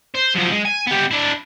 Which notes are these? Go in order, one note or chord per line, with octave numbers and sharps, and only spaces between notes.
C5
F#2 F3
G#3
G#5
B3 G4
D4 E4